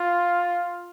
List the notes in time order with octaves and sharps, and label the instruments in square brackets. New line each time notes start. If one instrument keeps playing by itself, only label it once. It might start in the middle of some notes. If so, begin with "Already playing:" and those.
Already playing: [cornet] F4